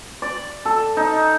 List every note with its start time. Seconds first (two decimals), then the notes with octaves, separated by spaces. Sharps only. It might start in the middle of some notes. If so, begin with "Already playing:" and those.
0.22 D5
0.65 A4
0.97 D#4